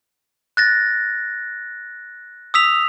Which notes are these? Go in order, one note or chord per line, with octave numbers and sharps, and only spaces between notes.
F#6 A6 A#6
D#6 E6 B6 F7